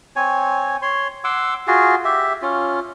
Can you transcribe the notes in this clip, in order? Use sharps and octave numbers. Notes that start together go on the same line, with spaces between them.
C4 C#5 G#5
C#5 C6
F#5 C6 D6 E6
F4 F#4 G#4
G4 E5
C#4 F4